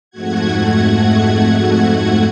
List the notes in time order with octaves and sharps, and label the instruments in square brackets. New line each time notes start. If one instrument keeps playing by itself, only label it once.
[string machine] F2 G#2 A3 F#4 F#5 G#6